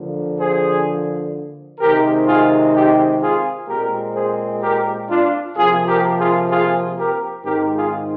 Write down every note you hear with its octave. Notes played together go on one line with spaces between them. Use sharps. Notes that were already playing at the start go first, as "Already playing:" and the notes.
Already playing: D3 F3 A#3
G#4 C5
C3 D#3 G#3 C4 G4 A#4
F4 G#4
D#4 G4
F4 G#4
A#2 G#3 C4 G4 A#4
G#4 C5
G4 A#4
D4 F4
C3 F3 A#3 F4 G#4
G4 A#4
F4 G#4
F4 G#4
G4 A#4
G#2 D#3 G#3 C4 G4 A#4
F4 G#4